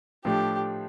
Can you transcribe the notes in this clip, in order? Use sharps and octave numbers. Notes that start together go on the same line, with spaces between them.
A2 F3 A3 D4 G4